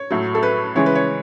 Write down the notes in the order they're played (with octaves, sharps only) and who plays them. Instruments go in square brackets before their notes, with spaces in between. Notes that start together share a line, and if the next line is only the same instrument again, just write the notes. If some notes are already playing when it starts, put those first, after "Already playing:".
Already playing: [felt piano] C#5
A2 F#3
A4
B4
C#3 E3 G#3 C#5
B4
C#5